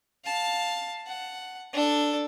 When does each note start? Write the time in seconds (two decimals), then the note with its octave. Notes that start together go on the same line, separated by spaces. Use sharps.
0.25 F5 A5
1.07 F#5
1.73 D4 A4